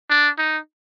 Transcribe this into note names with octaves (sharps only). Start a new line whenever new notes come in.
D4
D#4